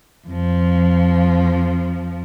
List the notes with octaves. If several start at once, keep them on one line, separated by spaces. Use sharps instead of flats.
F2 F3